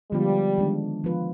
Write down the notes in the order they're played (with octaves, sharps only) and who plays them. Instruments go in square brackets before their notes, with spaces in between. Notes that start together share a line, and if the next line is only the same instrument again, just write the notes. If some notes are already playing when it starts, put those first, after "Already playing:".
[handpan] D3 F3 G#3 B3 F4 [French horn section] G3
[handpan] D#3 G#3 D4
F3 B3 F4 B4